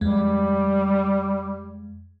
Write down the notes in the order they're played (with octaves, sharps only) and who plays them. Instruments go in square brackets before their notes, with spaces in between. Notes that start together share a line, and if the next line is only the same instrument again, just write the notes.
[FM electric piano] F2 G#3 [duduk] G3